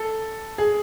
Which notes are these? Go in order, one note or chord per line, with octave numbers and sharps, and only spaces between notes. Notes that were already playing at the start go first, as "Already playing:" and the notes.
Already playing: A4
G#4